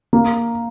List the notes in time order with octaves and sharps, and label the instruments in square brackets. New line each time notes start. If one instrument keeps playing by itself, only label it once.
[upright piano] A#3